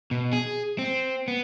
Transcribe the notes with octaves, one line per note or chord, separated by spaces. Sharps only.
B2
G#4
C4
B3